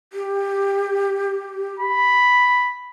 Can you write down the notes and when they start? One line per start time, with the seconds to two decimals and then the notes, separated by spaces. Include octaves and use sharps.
0.13 G4
1.80 B5